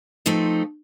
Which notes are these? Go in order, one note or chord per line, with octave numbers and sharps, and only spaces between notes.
F3 A3 C4 D#4